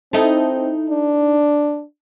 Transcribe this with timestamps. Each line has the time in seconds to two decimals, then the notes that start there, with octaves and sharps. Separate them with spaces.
0.13 C4 D#4 E4 A4
0.90 D4